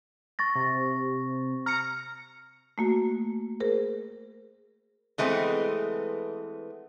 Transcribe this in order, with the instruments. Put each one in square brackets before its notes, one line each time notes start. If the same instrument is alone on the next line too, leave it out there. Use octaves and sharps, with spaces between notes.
[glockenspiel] C#6 A6 A#6
[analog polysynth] C3
[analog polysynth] A#5 [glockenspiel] F6 C#7
[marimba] A3 A#3 F#4
G#4 A#4 C5
[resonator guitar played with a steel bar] E3 G#3 A3 B3 C4